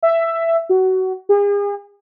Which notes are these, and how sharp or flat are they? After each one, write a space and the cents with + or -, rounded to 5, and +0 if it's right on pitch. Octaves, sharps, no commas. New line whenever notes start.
E5 +10
F#4 +20
G#4 -40